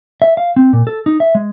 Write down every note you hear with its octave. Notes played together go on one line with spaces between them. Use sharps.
E5
F5
C4
A#2
A4
D#4
E5
G#3